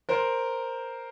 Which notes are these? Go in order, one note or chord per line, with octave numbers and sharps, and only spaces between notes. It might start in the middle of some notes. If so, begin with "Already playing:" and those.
A#4 C5